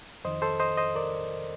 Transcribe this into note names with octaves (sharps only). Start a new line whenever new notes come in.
F2 D#3 C5 D#5
A4 C5
C5 D#5
C5 D#5
A#4 D5